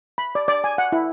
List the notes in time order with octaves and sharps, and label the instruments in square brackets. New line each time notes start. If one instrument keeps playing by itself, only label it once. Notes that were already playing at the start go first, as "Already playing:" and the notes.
[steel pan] B5
D5
D5
G#5
F#5
E4